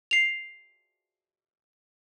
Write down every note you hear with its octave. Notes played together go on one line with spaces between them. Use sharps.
C7 F7